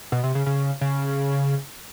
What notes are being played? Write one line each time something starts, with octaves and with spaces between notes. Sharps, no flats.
B2
C3
C#3
C#3
C#3